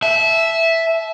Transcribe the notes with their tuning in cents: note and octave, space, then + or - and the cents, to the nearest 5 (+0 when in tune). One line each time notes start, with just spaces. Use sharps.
E5 +0 A5 -30